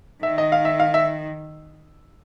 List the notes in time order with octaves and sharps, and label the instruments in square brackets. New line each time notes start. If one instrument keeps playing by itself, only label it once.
[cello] D#3 [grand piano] E5
[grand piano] D#5
F5
E5
F5
E5